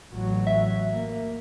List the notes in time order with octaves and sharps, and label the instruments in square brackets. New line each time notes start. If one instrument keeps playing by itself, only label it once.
[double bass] A1 F#3
[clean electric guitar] E5
[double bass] A#3